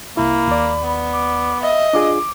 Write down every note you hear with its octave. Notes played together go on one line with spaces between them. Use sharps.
C2 A#3 E4 B5
D#2 D5
B3
D6
D#5 E5
D4 F4 G#4 D6